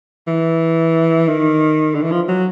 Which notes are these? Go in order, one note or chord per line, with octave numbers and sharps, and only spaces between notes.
E3
D#3
D3
E3
F3
F#3